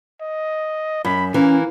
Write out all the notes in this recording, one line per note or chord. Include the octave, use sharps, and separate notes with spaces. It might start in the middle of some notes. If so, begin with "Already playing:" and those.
D#5
F#2 B5
E3 A#3 C#4